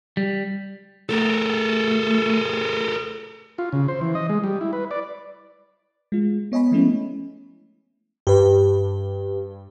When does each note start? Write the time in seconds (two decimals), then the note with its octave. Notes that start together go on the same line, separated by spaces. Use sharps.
0.17 G3
1.09 A3 A4 A#4
3.58 F4
3.72 C#3
3.88 C5
4.01 E3
4.15 D#5
4.29 G#3
4.44 G3
4.61 E4
4.73 B4
4.91 D5
6.12 G#3 F4
6.52 B3 C#5 D#5 G#5 B5
6.71 F3 G#3 A3 B3 C#4 E4
8.27 G2 G4 B4